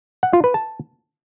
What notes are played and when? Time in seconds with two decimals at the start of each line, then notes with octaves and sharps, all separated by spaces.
0.23 F#5
0.33 F4
0.44 B4
0.54 A5